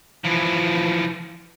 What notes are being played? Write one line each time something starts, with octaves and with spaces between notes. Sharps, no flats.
E3 F3